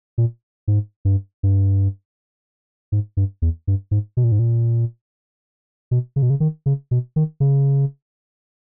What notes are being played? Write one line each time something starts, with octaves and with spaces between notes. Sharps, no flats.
A#2
G#2
G2
G2
G#2
G2
E2
G2
G#2
B2
A#2
G#2
A#2
B2
C#3
B2
C#3
D#3
C#3
B2
D#3
C#3